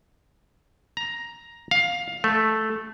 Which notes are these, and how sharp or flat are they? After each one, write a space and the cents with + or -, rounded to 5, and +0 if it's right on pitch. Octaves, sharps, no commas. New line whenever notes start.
A#5 +10
F5 +15
A3 -5